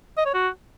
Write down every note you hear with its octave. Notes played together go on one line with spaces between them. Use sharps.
D#5
C#5
F#4